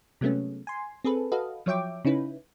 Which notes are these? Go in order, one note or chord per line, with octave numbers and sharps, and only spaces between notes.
C3 F#3 G#3 A3 B3 C#4
G#5 C6
C4 G#4 A4 B4
F#4 A4 B4 D#5 F5
F3 F#3 C#5 E5 G5 D6
C#3 C#4 D#4 E4 B4